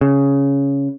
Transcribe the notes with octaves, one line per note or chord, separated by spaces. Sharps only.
C#3